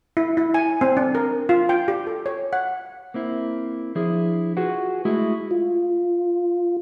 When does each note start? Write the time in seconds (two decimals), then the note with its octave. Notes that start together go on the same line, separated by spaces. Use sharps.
0.17 E4
0.37 E4
0.54 G#5
0.81 C4
0.97 D4
1.15 A#4
1.49 F4
1.69 G5
1.88 G4
2.07 A4
2.26 C#5
2.53 F#5
3.14 A#3 C4 E4
3.95 F3 D4 E4 G#4
4.57 F4 F#4 G#4 B4 F#5
5.05 G#3 A3 E4 F#4 G#4
5.51 F4